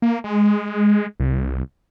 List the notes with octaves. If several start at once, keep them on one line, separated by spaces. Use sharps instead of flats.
A#3
G#3
C2